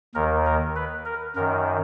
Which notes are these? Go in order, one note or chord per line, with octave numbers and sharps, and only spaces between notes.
D#2 D#3 A#4
A#4
B4
A#4
F#2 D#3 A#4